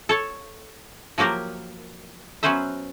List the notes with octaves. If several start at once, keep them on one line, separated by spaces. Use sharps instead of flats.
A4 C#5 A5
F3 F#3 A#3 G4 A#4
F#3 B3 C#4 B4 C5 E5